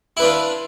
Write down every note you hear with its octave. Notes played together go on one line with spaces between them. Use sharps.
D4 E4 F4 B4